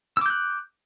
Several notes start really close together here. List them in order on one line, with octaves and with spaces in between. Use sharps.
E6 D6 G6 F#6